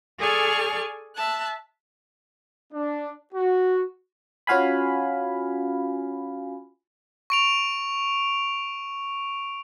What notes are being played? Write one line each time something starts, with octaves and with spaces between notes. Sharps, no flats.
G#4 A4 D5 G#5 C#6 F6
E5 A5 F#6
D4
F#4
C#4 F4 F#4 F5 G#5 B5
C#6 D7 F7